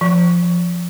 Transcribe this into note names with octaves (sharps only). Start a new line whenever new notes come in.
F3